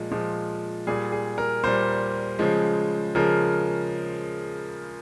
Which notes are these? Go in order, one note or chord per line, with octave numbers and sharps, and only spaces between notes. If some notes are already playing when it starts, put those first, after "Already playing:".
Already playing: A#2 F3 G#3
A#2 F3 G#3
A#2 G3 G#4
G#4
A#4
A#2 G3 C5
C#3 F3 G#3
C#3 F3 G#3 A#4